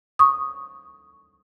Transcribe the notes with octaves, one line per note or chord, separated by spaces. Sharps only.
C#6 D#6